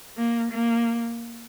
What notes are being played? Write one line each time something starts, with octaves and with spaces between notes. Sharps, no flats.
A#3
A#3